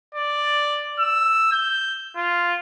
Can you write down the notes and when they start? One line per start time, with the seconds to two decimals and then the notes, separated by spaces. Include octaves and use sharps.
0.15 D5
1.00 E6
1.52 G6
2.16 F4